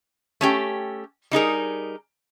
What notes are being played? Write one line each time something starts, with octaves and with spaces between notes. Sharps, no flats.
A3 C#4 G4
G3 D#4 G#4 A#4